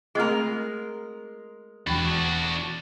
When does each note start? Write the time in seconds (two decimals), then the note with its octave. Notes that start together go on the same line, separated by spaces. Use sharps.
0.15 G#3 A3 C4 F4 A#4
1.87 E1 E2 D4 F#4 G5 B5